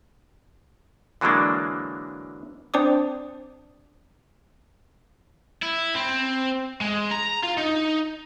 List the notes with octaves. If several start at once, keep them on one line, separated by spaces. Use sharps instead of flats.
D3 E3 F#3 G#3 A#3 D4
C4 D4 C5 D5 D6 D#6
E4
C4
G#3
A#5
F4
D#4